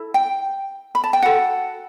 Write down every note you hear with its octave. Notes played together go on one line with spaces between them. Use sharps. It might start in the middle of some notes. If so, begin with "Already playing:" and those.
Already playing: E4 A4
G5
B5
A5
G5
F#4 A4 F#5